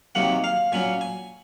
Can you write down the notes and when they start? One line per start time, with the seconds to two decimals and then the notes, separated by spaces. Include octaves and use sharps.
0.15 C3 D#3 F#3 A#3 F#5
0.44 F5
0.72 A#2 F#3 C#4 G#5
1.01 G#5